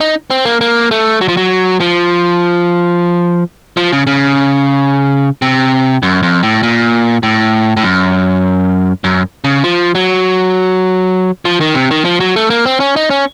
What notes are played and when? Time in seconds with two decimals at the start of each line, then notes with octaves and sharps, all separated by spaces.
0.01 D#4
0.30 C4
0.45 A#3
0.61 A#3
0.91 A3
1.21 F#3
1.28 F3
1.37 F#3
1.80 F3
3.77 F3
3.92 C#3
4.07 C#3
5.42 C3
6.03 F#2
6.23 F2
6.43 A2
6.63 A#2
7.23 A2
7.77 A2
7.84 F#2
9.04 F#2
9.44 C#3
9.64 F3
9.95 F#3
11.45 F3
11.61 D#3
11.75 C3
11.91 D#3
12.05 F3
12.20 F#3
12.36 A3
12.50 A#3
12.66 C4
12.80 C#4
12.96 D#4
13.10 C#4